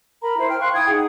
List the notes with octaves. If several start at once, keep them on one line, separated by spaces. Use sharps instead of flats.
A#4 A#5 B5
E4 C5
G5 F6
F5 C6 C#6 F#6
E4 G5 D#6 G#6
D#4 G#4 F#5